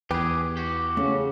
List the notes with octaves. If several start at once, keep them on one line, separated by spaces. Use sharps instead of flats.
E2 G4 G#4 B4 G5
F#4 G4
C#3 A3